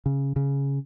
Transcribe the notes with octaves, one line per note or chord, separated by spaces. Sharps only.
C#3
C#3